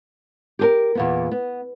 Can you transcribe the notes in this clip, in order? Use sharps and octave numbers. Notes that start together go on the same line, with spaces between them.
G4 G#4 A#4
E2 A#2 B3
B3